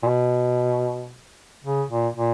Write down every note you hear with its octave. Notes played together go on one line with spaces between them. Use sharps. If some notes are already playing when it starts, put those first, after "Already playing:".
A#2
B2
C#3
A#2
A#2